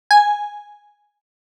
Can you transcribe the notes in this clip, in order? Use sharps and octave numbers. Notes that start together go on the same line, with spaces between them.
G#5